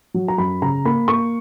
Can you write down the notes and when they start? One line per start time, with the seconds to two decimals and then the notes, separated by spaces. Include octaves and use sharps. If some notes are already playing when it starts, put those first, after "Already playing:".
0.14 F#3
0.28 A#5
0.38 F#2 B5
0.62 C#3 A#5
0.85 A#3 B5
1.08 A#3 C#6